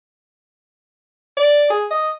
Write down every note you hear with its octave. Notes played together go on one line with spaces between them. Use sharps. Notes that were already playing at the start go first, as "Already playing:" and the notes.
D5
G#4
D#5